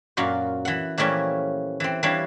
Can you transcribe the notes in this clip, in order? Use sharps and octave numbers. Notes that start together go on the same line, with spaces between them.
F#2 A#2 F4 F#4
E3 F#5
A#2 E3 F3 G3 A3 C#4
E3 C4
E3 G3 D4 C#5 F5